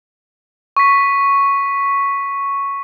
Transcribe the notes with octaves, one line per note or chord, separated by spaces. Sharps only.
C#6 B6